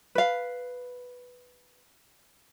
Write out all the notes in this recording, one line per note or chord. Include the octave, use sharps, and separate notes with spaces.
B4 F5